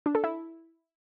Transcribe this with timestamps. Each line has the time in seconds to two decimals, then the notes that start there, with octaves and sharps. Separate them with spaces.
0.06 D4
0.15 A4
0.24 E4